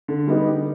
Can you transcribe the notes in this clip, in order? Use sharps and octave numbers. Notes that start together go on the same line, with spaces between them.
D3
G3 B3 D#4 G4
D3